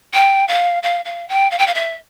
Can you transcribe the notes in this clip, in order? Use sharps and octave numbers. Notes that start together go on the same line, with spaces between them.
G5
F5
F5
F5
G5
F5
G5
F5
E5